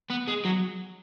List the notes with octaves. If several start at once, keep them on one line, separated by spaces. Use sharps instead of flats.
B3
G#3
F#3